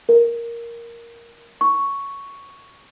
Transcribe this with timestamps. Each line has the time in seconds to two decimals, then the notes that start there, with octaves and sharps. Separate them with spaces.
0.09 A#4
1.61 C#6